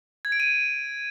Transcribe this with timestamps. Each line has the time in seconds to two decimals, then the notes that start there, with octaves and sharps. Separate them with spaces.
0.25 G#6
0.32 D7
0.40 D#7